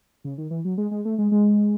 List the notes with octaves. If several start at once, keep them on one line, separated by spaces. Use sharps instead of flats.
C#3
D#3
E3
F#3
G#3
G#3
A3
G#3
G#3